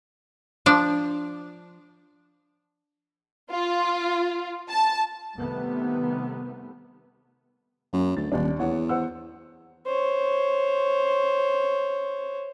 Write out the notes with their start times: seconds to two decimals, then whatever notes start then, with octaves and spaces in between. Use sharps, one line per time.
0.66 F3 D4
3.52 F4
4.70 A5
5.38 C3 D#3 G3 A3 B3
7.93 F#2 A#3
8.17 D2 A6
8.32 D#1 D#2 D4
8.59 E2 C#5 F#5
8.89 C5 F#5 E6
9.86 C5 C#5